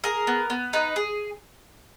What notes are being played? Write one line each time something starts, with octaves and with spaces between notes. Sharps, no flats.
G#4 A#4
B3
B3
D#4 B4
G#4